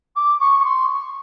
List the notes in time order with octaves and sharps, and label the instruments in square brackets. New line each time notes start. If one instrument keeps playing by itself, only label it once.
[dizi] D6
C#6
C#6
C6
C#6